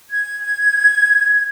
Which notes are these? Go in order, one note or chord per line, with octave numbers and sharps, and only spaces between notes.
G#6